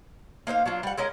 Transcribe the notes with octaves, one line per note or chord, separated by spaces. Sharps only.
A#3 D#4 C5 F5
F#3 D4 F4
G3 F#5
G#3 C#4 A#4 D#5